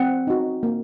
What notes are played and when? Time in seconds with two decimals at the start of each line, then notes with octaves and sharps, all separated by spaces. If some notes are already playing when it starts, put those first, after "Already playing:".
Already playing: C4 F#5
0.27 D#4 F#4
0.63 A#3